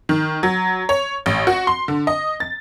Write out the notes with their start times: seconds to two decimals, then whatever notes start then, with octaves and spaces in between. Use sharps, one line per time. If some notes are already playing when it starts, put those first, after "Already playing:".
0.09 D#3
0.43 F#3
0.89 C#5
1.26 A1
1.47 F#4
1.67 C6
1.88 D3
2.07 D#5
2.40 A6